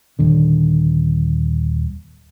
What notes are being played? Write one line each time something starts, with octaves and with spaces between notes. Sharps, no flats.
D#1 D#2 D3